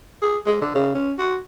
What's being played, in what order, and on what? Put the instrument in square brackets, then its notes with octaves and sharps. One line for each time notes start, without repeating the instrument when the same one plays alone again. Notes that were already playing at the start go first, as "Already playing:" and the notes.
[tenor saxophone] G#4
G#3
D3
C#3
C#4
F#4